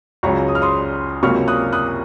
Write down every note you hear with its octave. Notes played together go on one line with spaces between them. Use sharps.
C#2 C#3 F#3 A#5 C#6
D#6
F6
C6 D#6
C#2 C3 F#3 A#3 C#6 F6
D#6 F#6
D#6 F#6